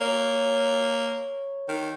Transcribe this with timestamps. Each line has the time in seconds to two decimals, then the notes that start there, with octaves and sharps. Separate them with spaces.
0.01 A#3 C#5
1.68 D#3